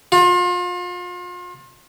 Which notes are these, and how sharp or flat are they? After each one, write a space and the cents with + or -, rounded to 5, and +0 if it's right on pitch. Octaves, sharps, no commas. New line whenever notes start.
F4 +35